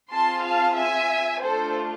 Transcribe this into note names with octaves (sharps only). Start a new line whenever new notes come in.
C4 F4 G#4 A5 C6
F5 A5
E5 G#5
A3 D4 F4 A4 C5